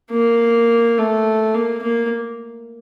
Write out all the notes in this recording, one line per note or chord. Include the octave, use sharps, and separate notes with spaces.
A#3
A3
A#3
A#3